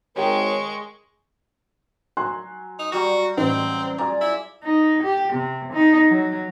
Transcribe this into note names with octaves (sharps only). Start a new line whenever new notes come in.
G#1 G#3 G4 G#4 A#4 C#5 G5 C#6
F#3 G#5 C6 F#6
D#4
F#3 G3 F#4
A1 C4 B4 D#5
F4 G#4 D5 A#5
E4
D#4
G4
C3
D#4
F#3